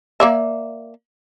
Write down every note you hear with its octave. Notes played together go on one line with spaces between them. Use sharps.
A#3 D5 E5